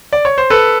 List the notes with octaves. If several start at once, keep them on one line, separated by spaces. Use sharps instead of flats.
D5
C#5
C5
A4 B4